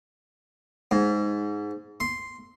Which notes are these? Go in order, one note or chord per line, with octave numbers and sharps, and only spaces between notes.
G#2
C6